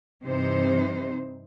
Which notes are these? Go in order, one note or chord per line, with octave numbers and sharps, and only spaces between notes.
G2 C3 E3 D#4 C5